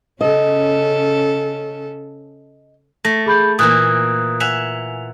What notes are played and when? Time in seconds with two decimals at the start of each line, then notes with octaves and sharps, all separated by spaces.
0.21 C#3 C#4 A4 D#5
3.05 A3 A#6
3.26 G#4 B5 G6
3.59 A#2 E3 A#3 D#6 F#6
4.40 E5 F#5 G#5 F7